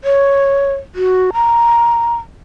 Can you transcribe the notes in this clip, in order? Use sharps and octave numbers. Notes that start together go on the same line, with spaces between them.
C#5
F#4
A#5